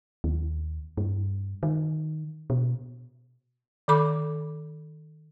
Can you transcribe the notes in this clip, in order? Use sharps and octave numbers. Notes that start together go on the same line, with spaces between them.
D#2
G2
D#3
B2
D#3 A4 B5 D6